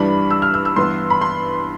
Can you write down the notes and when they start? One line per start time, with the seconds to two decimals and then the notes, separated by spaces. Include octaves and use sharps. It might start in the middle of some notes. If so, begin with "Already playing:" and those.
Already playing: G2 E3 G3 D4 B5
0.31 E6
0.42 F6
0.54 E6
0.65 E6
0.76 G2 E3 B3 C6
1.10 B5
1.21 C6